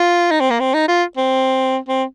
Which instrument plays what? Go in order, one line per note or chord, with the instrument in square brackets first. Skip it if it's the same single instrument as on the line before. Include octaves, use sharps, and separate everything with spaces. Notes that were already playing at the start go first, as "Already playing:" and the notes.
Already playing: [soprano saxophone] F4
D#4
C4
A#3
C4
D#4
F4
C4
C4